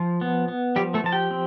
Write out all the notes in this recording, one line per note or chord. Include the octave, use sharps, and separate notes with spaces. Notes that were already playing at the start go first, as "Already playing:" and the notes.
Already playing: F3
B3
B3
F3 G3 G4
A3 A4
F3 A5
G4 G5
C4